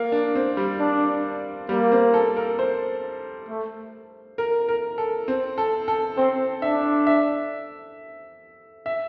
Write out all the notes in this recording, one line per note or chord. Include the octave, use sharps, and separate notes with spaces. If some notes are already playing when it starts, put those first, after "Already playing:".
Already playing: A#3
D4
C4
G3
D4
G3 A#3
C4
A4
A#4
C5
A3
A#4
A#4
A4
C4
A4
A4
C4 C5
D4 E5
E5
E5